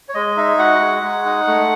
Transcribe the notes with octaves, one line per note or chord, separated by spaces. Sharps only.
C#5
G#3 D#5
D#4 E5
F#4 F#5
G#3
G#3
D#4
A3